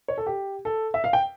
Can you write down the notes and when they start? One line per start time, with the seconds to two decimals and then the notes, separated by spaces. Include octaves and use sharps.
0.08 C#5
0.18 A4
0.26 G4
0.65 A4
0.94 E5
1.04 F5
1.13 G5